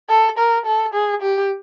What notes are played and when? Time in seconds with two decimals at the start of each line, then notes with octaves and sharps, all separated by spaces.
0.09 A4
0.38 A#4
0.66 A4
0.94 G#4
1.22 G4